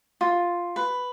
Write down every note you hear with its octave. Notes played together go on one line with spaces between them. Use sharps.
F4
B4